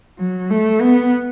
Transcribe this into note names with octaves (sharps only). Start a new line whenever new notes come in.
F#3
A3
B3